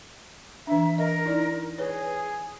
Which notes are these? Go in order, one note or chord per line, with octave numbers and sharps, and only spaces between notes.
E3 D4 E5
A#4 D#5
D#4 E4 D5
G#4 B4 C#5